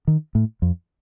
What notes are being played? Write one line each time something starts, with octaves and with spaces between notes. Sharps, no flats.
D#3
A2
F2